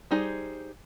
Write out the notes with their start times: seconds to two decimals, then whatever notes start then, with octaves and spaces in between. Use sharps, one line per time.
0.11 G3 D#4 G#4 C5